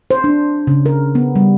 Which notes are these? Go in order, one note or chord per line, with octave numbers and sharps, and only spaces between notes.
C5
D4
C#3
A#4
B3
G3